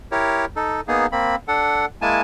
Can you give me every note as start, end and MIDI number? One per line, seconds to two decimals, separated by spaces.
0.12 0.45 64
0.12 0.45 67
0.12 0.45 70
0.12 0.45 73
0.56 0.81 63
0.56 0.81 69
0.88 1.06 58
0.88 1.06 59
0.88 1.06 63
0.88 1.06 68
1.12 1.36 58
1.12 1.36 60
1.12 1.36 83
1.48 1.86 62
1.48 1.86 69
1.48 1.86 78
2.02 2.22 56
2.02 2.22 58
2.02 2.22 64
2.02 2.22 80
2.02 2.22 81